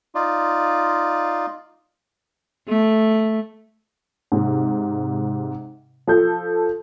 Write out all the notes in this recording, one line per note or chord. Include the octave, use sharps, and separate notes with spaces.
D#4 F4 D5
A3
G#2 C3
F3 A4 G6